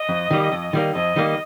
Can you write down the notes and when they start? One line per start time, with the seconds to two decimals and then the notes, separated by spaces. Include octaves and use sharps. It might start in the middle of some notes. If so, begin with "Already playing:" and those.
Already playing: D#5
0.09 F2
0.31 D#3 G3 A#3
0.52 F2
0.73 D#3 G3 A#3
0.95 F2 D#5
1.16 D#3 G3 A#3